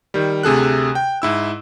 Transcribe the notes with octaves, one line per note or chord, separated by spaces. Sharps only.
D#3 G3
D2 C3 G#4 A4 F#6
G5
G#2 E4 E6